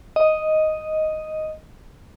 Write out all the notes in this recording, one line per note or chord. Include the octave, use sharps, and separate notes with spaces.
D#5